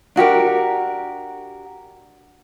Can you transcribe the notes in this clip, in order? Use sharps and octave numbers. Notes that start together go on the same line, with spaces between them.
D4 F#4 G4 A#4